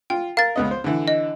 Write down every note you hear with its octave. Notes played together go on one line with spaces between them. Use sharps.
F4 G5
A#4 F5 A6
C#2 B3 D#5
C5
D3 E3
D#5